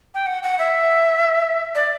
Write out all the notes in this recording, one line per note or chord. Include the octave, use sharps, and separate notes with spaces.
G5
F#5
F#5
E5
D5